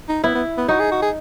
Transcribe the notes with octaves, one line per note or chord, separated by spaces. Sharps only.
D#4
B3 E4
B3
B3
D#4 F#4
G#4
F#4
G#4